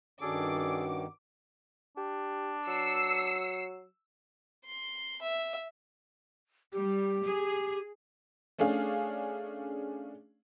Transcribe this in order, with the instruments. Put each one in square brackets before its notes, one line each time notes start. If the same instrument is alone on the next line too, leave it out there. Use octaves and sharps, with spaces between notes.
[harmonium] G2 D#3 [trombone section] C#4 F#4 [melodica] D4 G#4 A4 [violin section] D6
[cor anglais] D4 [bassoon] G4
[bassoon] F#3 [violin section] E6 C7 C#7
[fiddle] C6
E5
[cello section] G3 [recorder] G4
[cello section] G#4
[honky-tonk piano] A3 C#4 D4 G#4 F5